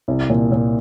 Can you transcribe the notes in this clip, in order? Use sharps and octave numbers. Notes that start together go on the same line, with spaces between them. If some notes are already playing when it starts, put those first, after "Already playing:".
C2
A#2
A#2